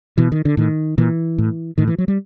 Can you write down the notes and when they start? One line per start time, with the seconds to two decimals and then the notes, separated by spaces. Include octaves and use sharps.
0.18 B2 E3
0.32 D#3
0.45 D3
0.57 A2 D#3
0.98 A#2 E3
1.38 A2
1.78 A2 D#3
1.88 E3
1.98 F#3
2.08 G3